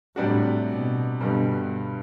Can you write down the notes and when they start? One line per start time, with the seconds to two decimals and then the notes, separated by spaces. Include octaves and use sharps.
0.16 A2 C3 G3 D4 F#4
0.68 B2
1.20 G2 B2 D3 G3